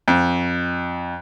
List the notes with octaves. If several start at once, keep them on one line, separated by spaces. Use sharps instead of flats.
F2